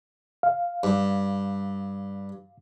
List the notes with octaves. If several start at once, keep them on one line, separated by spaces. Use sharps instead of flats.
F5
G2